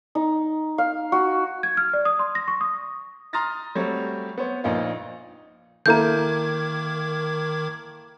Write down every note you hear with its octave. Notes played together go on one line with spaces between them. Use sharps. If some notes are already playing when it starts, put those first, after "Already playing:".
D#4
F5
F#4
G#6
F6
D5
D#6
C6
A#6
C#6
D#6
A#5 C6 D#6 F6 A6 A#6
F#3 G3 A3 C4 C#5
B3 C5 C#5
A#1 A#2 D#4 F4
D#3 A#3 E4 A4 A#5 D6 G6 G#6